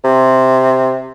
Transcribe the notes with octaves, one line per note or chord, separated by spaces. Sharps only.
C3